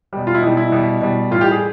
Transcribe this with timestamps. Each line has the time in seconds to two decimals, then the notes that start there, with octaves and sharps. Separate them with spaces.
0.13 B2 G3
0.27 F4
0.34 E4
0.42 B2 G3 D#4
0.57 E4
0.72 B2 G3
1.02 B2 G3
1.31 A2 E3 G3 F4
1.41 G4
1.51 G#4